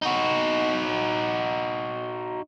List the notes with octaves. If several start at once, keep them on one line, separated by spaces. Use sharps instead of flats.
D#4 F#4